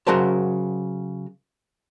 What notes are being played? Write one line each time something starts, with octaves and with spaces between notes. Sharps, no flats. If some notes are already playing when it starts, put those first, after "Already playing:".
C#3 F#3 F#4 A#4 C5 A5